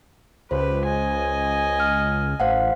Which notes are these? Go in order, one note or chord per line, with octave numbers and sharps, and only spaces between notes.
C#2 G4 B4 C5
D#5 G#5
F6
A1 C5 F5 F#5